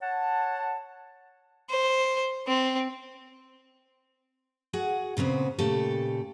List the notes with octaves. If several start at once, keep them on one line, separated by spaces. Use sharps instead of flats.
C#5 F#5 A5
C5
C4
F#4 G#4 F#5
A#2 C#3 B3 C4
A#2 C#3 A3 G4 A4